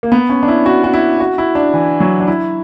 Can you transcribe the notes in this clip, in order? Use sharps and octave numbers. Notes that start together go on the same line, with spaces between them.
A#3
B3
C#4
D4
E4
F#4
F#4
E4
F#4
E4
D4
E3
F#3
D4
E4